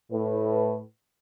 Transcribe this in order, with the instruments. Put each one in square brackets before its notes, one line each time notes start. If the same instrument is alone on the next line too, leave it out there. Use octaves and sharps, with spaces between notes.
[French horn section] A2 B4